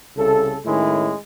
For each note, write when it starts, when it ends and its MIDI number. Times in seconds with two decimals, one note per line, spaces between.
0.17 0.57 36
0.17 0.57 49
0.17 0.57 69
0.66 1.15 45
0.66 1.15 51
0.66 1.15 56
0.66 1.15 61
0.66 1.15 64